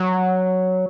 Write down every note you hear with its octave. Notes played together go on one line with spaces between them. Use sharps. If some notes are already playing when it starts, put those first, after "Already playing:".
Already playing: F#3